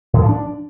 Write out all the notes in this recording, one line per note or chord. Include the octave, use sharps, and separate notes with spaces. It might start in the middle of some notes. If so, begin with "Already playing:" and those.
A2
F3
D4